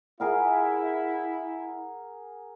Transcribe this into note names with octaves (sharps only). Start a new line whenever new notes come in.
E4 G#4 A#4 F#5